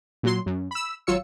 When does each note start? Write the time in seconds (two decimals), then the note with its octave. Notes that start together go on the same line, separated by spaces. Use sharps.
0.23 A#2 F#3 C6
0.46 F#2
0.71 B5 E6
1.07 G#1 F#3 F4 C#5 E6 C#7